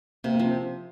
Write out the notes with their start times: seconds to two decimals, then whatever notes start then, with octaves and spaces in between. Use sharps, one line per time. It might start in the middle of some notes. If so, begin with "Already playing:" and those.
0.24 C3 A#3
0.34 A#3
0.39 F3
0.45 C4